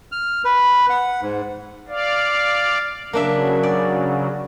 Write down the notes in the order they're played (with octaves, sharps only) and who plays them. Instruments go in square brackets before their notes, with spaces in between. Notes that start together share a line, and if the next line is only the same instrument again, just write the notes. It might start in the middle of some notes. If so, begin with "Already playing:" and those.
[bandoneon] F6
B4
F#5
G#2
[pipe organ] D5 F5
[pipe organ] C#3 F#3 [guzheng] A#3 D4 E5
[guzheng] D5